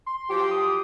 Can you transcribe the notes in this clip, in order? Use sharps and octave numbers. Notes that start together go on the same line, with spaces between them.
C6
F3 F#3 G4
D#6